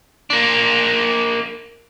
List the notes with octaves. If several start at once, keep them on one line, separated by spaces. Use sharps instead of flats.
A#3 D4